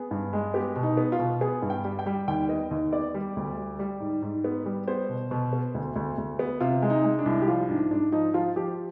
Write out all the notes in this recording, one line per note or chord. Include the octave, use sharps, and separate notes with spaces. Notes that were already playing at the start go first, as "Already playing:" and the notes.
Already playing: B3 G#4
G2
G#3
B3 G4
B2
D#4
B3
F4
B2
B3 G#4
G2
G5
G3
G5
G3
D#2 G5
B3 D#5
D#2 D#5
B3 D5
G3
D2
G3
G3
G#2
G#2
B3
G3
B3 C5
B2
B2
B3
D2
D2
D2
B3
C3 F4
G#3
D#4
G#3
D4
C2
G4
F3 F4
G#2 D4
G#2 D4
F3 D#4
F3 F4
F3 G4